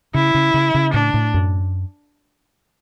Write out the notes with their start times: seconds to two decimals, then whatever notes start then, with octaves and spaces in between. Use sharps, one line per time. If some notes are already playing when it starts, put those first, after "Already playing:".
0.14 C#3 E4
0.34 C#3
0.54 C#3
0.74 C#3
0.93 A2 D4
1.14 A2
1.34 F#2